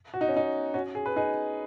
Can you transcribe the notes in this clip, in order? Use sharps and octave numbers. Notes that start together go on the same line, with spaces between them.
F#4
D#4
C#4
D#4
C#4 F#4
G#4
B4
D#4 G#4